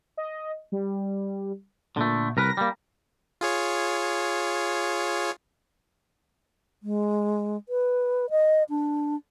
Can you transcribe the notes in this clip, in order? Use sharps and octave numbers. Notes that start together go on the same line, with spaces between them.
D#5
G3
A#2 D3 A3
C2 A#4 B4 A#6
G3 A#3
F4 G#4 C#5
G#3
B4
D#5
D4